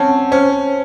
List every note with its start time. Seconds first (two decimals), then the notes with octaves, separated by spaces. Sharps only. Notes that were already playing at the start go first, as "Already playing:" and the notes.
Already playing: C4 C#4 F#5 A5
0.32 C#4 C5